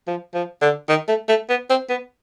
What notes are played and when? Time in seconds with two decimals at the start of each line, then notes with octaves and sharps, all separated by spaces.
0.08 F3
0.34 F3
0.62 D3
0.89 D#3
1.08 A3
1.29 A3
1.49 B3
1.70 C4
1.90 B3